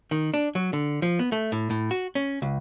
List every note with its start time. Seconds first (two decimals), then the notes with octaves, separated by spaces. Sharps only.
0.11 D#3
0.34 D4
0.55 F#3
0.73 D3
1.02 F3
1.19 B3
1.32 A3
1.52 A2
1.70 A2
1.91 F#4
2.15 C#4
2.42 C#2